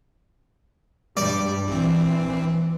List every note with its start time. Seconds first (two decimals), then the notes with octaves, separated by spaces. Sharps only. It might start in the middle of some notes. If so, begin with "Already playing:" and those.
1.17 G2 G3 D5
1.68 A#1 E3 C4